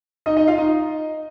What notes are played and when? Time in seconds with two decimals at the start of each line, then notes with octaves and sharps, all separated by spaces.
0.26 D#4 D#5
0.37 D#4 D#5
0.47 F4 F5
0.58 D#4 D#5